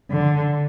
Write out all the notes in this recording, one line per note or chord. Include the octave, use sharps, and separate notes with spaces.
D3